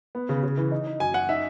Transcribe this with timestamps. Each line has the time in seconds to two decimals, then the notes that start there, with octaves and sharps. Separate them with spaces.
0.15 B3
0.29 C#3
0.43 C#3
0.57 E3
0.72 D#4
0.87 D#4
1.00 F#2 G#5
1.14 F#2 F#5
1.29 D#4 E5